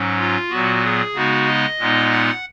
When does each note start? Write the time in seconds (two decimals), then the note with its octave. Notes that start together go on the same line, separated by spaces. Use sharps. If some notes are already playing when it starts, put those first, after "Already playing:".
Already playing: G#2 F#3 C#4
0.18 F4
0.50 A#2 F#3 B3 F#4
0.83 G#4
1.14 C#3 G#3 B3 D#4 F#4
1.47 D#5
1.78 A#2 G#3 B3 D#4
2.12 F#5